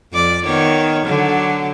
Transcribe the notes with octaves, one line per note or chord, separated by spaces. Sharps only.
F2 D5
D#3 B3 C#5
D3 F#3